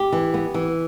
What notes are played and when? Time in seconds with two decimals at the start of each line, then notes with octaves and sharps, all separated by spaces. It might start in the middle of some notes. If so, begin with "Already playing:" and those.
Already playing: G4
0.12 E3
0.34 B3
0.54 E3